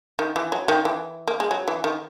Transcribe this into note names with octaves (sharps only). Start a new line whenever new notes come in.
D#3
E3
F#3
D#3
E3
A#3
G#3
F#3
E3
D#3